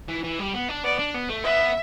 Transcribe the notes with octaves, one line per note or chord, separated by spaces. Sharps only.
E3
E3
G3
B3
D4
B3 D5
D4
B3
A3
B3 E5